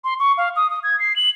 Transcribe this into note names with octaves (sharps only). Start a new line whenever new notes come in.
C6
C#6
F5
D#6
D#6
G#6
C7
F#7